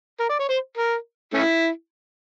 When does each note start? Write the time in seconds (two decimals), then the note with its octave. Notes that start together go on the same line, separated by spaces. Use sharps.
0.20 A#4
0.29 D5
0.39 C#5
0.49 C5
0.77 A#4
1.34 A3 C#4 E4